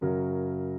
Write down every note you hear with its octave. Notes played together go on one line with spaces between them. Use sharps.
F#2 C#3 F#3 A#4